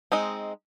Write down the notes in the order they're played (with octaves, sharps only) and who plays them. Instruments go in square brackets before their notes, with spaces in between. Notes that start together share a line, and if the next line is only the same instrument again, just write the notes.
[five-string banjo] G#3 C4 D#4